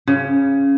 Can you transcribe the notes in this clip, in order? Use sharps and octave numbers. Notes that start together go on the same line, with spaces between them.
C#3